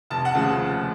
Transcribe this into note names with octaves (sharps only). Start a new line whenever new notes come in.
F1 A5
F#5
D#2 C#3 F3 A3 A5